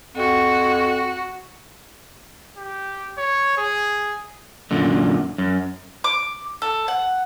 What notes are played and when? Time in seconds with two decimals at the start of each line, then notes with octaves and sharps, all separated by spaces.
0.16 F2 F#4
2.57 G4
3.18 C#5
3.58 G#4
4.71 F#2 A#2 D3
5.38 F#2
6.04 D6
6.62 A4
6.88 F#5